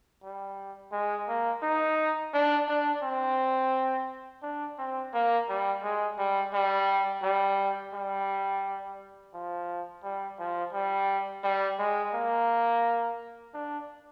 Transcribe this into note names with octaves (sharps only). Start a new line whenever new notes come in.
G3
G#3
A#3
D#4
D4
D4
C4
D4
C4
A#3
G3
G#3
G3
G3
G3
G3
F3
G3
F3
G3
G3
G#3
A#3
D4